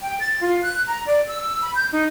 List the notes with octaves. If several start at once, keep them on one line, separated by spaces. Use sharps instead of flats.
G5
A6
F4
F#6
A#5
D5
E6
B5
G6
D#4